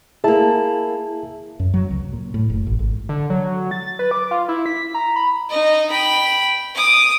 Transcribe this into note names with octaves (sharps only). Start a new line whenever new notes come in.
A#3 E4 G#4 E5 A5
F#2
F#3
C#2
A#2
A2
F#1
A1
G#1
D3
F#3
A6
B4
D6
F4
E4
B6
A#5
B5
D#4 D#5
G5 B5
D6 D#6